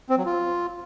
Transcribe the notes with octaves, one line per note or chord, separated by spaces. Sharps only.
C4
F#3
F4